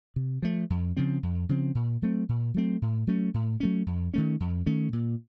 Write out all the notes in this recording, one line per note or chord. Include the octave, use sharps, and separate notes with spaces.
C3
F3 A3
F2
C#3 F3 C4
F2
C#3 F3 C4
A#2
F#3 A3 C4
A#2
F#3 A3 C4
A2
F#3 A3 C#4
A2
F#3 A3 C#4
F2
D#3 A3 C#4
F2
D#3 A3 C#4
A#2